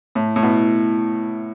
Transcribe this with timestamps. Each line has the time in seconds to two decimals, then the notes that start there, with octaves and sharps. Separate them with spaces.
0.15 A2
0.36 A2
0.43 B2